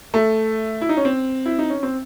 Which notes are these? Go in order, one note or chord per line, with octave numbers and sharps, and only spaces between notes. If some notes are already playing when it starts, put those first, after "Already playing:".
A3
E4
D#4
C#4
C4
E4
D#4
C#4
C4